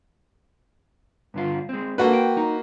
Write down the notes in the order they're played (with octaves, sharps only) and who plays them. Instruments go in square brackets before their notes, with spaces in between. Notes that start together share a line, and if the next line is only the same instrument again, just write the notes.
[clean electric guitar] G2 D3 F4
G#3 C4
[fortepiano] A#3 F#4 B4 [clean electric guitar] D4 A4
[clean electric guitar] G5
D#4